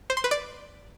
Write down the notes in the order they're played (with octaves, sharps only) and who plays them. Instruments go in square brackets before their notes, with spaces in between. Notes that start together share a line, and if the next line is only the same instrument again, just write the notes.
[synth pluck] C5
C6
B4
D5